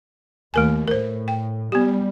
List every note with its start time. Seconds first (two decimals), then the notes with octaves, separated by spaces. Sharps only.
0.54 D#2 A3 A#4 G#5
0.88 A2 A#4 C5
1.28 G5
1.72 G3 B3 G4